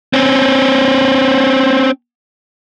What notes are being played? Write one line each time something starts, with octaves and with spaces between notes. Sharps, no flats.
C4 C#4